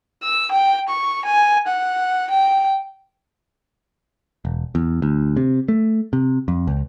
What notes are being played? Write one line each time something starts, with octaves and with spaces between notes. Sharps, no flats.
E6
G5
C#6
G#5
F#5
G5
E1
E2
D2
C3
A3
C3
F2
C#2